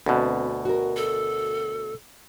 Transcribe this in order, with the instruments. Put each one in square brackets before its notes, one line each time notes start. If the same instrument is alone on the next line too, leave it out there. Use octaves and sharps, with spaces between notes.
[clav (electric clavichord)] D2 B2 [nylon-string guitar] C4 F#4 B4
[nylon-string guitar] F#4 A#4
[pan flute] A4